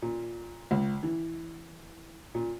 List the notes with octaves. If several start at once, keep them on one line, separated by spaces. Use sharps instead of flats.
A#2
C#2
E3
A#2